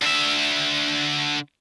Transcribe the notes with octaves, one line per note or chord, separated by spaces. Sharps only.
D3 E5